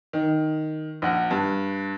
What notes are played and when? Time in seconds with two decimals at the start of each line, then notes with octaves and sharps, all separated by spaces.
0.13 D#3
1.02 A#1 F#5
1.31 G2